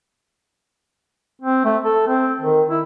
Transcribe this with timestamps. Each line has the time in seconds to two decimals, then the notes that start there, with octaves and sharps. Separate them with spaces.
1.42 C4
1.65 A3
1.84 A4
2.07 C4
2.40 D#3
2.70 E4